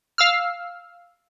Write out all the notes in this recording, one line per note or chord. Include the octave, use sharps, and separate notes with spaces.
F5 E6 F6